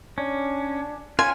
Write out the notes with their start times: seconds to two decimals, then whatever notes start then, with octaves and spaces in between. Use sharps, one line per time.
0.18 C#4 D4
1.19 C#4 F4 G#5